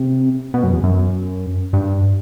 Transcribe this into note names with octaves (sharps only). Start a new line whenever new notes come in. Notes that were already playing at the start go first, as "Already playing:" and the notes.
Already playing: C3
B2
F#2
E2
F#2
G2